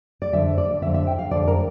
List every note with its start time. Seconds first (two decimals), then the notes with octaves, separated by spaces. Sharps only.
0.22 D5
0.33 F2 D3 E5
0.58 D5
0.82 D3 E5
0.86 F2
0.94 E5
1.07 G5
1.19 F5
1.31 F2 D3 D5
1.48 A#4